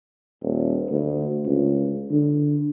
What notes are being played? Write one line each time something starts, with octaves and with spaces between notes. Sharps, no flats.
D#1
D2
C#2
D3